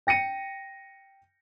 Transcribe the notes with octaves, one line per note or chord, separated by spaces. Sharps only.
G5 A#6 C#7 D#7